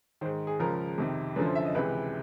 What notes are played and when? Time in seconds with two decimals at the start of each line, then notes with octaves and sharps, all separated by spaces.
0.21 D#3 C5
0.25 G#2
0.47 G#4
0.59 C#2 C#3 F3 A#4
0.98 F2 C3 D#3
1.36 F#2 D3 F3 B4
1.46 C5
1.55 E5
1.65 D#5
1.75 C#2 C3 E3 B4